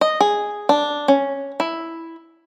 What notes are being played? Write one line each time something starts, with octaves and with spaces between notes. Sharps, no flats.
D#5
G#4
D4
C#4
E4